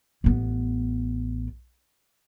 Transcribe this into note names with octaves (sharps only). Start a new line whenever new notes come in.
A1 B3